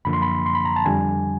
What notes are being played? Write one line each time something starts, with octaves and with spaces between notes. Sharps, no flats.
F#2 D3 F3 A#3 B5
C6
B5
C6
B5
A#5
A5
F2 D3 G3 G#5